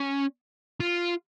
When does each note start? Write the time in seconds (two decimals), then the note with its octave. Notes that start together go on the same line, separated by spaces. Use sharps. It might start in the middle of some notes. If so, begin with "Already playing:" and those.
Already playing: C#4
0.80 F4